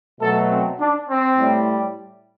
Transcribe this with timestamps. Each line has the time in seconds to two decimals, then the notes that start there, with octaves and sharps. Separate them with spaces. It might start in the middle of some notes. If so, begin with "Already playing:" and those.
0.21 B2 F#3 A3 A4
0.50 C4
0.79 D4
1.09 C4
1.38 A2 G3